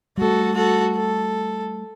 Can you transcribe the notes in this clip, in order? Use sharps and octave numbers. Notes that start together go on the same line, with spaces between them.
G3 A3 F#4 A4
F#4 A4
A4